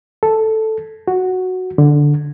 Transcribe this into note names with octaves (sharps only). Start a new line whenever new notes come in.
A4
F#4
D3